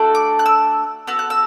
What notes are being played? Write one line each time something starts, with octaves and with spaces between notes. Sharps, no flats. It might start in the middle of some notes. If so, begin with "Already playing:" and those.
Already playing: A3 D4 F#4 A4
D6
F#6
E6
B3 F#4 A4 E6
F#6
E6